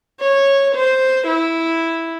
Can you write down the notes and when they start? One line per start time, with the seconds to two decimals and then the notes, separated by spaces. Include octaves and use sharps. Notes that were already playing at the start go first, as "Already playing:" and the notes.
0.20 C#5
0.75 C5
1.27 E4